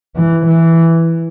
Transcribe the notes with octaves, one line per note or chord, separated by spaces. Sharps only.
E3
E3